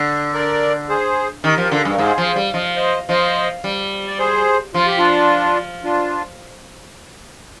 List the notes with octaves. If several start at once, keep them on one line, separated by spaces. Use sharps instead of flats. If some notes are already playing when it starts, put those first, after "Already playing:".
Already playing: D3
A#4 D5
G#4 C5
D#3 G4 A#4
F3
D3 F4
G4
G2 G#4
A#4
G#2 G#4 C5
F3
G3
F3 D#5
C5 D#5
F3 C5 D#5
G3
D5
G#4 C5
F3 F4
G4
D4 F4
D4 F4